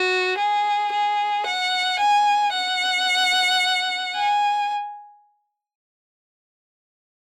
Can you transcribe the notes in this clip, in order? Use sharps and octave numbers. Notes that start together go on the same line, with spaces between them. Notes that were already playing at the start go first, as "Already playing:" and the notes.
Already playing: F#4
G#4
G#4
F#5
G#5
F#5
G#5